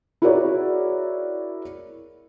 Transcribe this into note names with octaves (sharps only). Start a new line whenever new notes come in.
E4 F#4 G#4 A#4 C#5 D5